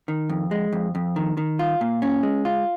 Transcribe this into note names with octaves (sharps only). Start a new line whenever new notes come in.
D#3
F2
G#3
F2
F2
D#3
D#3
F4
A#2
C#4
G#3
F4